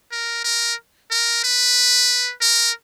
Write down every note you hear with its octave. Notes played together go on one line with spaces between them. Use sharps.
A#4
A#4
A#4
B4
A#4